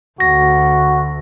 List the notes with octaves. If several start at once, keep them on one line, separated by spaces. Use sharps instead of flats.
D2 F#4 A#6